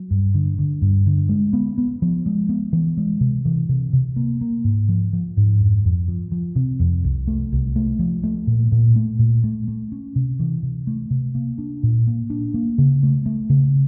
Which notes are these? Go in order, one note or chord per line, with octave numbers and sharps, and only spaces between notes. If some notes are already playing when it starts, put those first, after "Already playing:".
Already playing: F#3
G2
D3
D3
G2
D3
G#3
B3
B3
F3
G#3
B3
E3
G#3
C3
E3
C3
C3
A#3
A#3
G#2
F3
F3
G#2
F2
F2
F3
F3
C3
F2
C2
A3
C2
A3
F3
A3
A#2
A#2
A3
A#2
A3
A3
C#4
C3
E3
C3
A3
C3
A#3
D4
A#2
A#3
D4
A#3
C#3
A3
A3
C#3